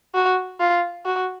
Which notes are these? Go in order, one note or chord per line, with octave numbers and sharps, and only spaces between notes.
F#4
F4
F#4